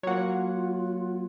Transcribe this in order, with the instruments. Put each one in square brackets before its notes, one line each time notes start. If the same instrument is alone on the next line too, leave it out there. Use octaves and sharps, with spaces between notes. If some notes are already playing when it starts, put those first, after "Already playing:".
[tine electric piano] F#3 A#3 [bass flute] F4 [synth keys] C#5 F#5